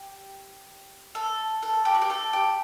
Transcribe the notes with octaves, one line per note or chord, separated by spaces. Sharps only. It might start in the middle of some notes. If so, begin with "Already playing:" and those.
Already playing: G4
A4
A4
G4
F#4
G4
A4
G4